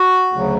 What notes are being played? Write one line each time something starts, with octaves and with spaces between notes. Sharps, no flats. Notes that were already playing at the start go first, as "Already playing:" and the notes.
Already playing: F#4
D2 C#3 F#3